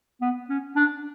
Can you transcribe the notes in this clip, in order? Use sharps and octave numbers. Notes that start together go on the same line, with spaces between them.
B3
C#4
D4